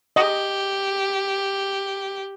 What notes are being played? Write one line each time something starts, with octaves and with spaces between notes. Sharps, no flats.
G4 D#5